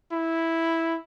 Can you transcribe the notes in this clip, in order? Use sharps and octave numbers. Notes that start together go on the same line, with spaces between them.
E4